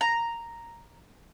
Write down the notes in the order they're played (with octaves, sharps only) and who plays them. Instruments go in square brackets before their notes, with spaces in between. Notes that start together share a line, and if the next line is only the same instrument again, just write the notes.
[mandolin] A#5